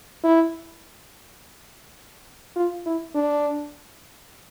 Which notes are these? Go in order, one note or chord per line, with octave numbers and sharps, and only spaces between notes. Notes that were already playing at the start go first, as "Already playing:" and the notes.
E4
F4
E4
D4